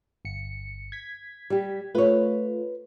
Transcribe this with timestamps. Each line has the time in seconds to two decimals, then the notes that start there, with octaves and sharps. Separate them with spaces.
0.25 G1 C#7
0.92 G#6 B6
1.50 G3 G4
1.95 A3 F4 B4 C#5